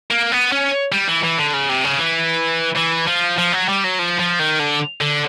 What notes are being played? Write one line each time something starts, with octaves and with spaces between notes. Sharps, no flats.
A#3
B3
C#4
G3
E3
E3
D3
C#3
C3
C#3
E3
E3
F3
F3
F#3
G3
F#3
F3
F3
D#3
D3
D3